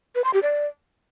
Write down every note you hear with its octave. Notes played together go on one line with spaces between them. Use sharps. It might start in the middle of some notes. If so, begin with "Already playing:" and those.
B4
C6
G4
D5